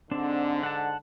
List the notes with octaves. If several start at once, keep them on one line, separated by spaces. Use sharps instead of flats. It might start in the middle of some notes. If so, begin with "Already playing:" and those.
G#2 D3 C4 D4
F#5 A5